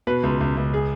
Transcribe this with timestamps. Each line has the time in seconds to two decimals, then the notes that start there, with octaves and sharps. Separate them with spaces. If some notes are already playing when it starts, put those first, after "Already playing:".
0.07 B2 B4
0.23 C#2
0.41 C#2
0.57 C#2
0.74 G#4